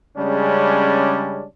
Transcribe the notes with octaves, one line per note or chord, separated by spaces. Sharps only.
C#3 G3 G#3 C#4 D4